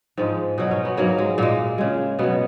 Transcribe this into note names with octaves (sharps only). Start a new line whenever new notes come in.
G#2 F3 G#3
B2 F#3 D#4
C#4
B3
G#2 F#3 A#3
G#3
A#2 G#3 A#3
C#3 G#3
B2 F#3 B3